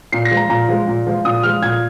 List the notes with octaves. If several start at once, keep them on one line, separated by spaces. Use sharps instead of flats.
A#2 C7
A#6
F3 G#3
A#5
A#2 A#5
F3 G#3
A#2
F3 G#3
A#2 D#6
F3 G#3 F6
A#2 G#6